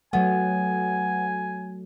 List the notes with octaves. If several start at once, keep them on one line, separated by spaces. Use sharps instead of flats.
F#3 A3 B3 G#5